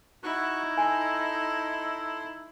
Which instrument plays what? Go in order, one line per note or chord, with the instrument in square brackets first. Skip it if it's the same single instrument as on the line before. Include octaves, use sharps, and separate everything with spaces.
[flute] D#4 [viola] E4 [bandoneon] F#4 C#6 F#6
[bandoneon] A4 C6 [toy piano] G#5